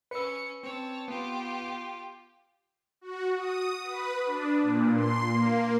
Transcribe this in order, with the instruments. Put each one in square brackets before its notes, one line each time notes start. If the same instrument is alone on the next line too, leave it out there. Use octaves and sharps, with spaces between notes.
[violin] C#4 C#7 [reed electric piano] B4 E6
[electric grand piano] C4 [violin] C#5 A5
[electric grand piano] B3 [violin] F4 G4
[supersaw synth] F#4
D#6
B4
D4
A#2
C6
A#3